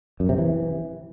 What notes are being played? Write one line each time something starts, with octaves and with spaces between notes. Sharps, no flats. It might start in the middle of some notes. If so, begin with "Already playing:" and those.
F#2
C3
E3